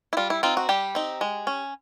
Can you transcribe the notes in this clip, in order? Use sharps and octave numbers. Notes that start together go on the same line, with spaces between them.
E4
G3 F4
E4
C4 D#4 F4
F#4
G3 G4
C4 D#4
G#3
C#4